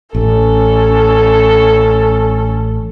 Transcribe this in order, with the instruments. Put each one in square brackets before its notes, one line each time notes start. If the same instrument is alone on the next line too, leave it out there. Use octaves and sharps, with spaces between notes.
[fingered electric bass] A1 [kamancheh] C#4 A4